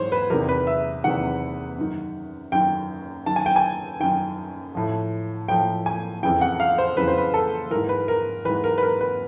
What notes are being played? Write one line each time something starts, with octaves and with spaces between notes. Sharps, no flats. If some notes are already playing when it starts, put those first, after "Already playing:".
Already playing: G#2 E3 C5 C#5
B4
E2 C3 D#3 A#4
B4
E5
E2 C3 D#3 F#5
F#2 D#3
F#2 D#3 G5
F#2 D#3 A5
G#5
G5
G#5
F#2 D#3 G5
A2 F3
A2 F3 G5
G#5
F2 C#3 E3 G5
F#5
F5
C5
F2 C#3 E3 B4
C5
B4
A4
G#2 E3 A#4
B4
A#4
G#2 E3 B4
A#4
B4
A#4
B4